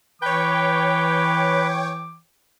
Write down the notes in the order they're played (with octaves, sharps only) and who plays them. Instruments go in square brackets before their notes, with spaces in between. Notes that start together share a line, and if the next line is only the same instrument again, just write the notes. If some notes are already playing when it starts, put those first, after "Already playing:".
[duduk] E3 [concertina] B4 [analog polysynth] C#5 G5 [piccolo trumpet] D6